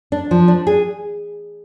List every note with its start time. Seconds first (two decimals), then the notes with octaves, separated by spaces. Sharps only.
0.12 D4
0.31 F3
0.48 D4
0.67 G#4